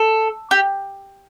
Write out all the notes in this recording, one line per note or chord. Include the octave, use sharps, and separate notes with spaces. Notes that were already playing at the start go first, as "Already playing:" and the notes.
Already playing: A4
G4